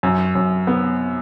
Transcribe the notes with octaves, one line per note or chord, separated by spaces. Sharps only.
F#2
F#2
B3